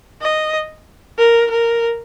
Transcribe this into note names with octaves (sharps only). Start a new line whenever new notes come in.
D#5
A#4
A#4